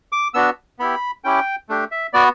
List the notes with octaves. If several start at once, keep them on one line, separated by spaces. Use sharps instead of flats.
D6
B3 D4 F#4 E6
B3 E4 G4 B5
C#4 E4 G4 G5
A3 D4 G4
E5
B3 F#4 D5